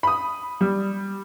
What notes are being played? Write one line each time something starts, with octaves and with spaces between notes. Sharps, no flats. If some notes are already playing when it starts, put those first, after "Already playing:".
B5 D#6
G3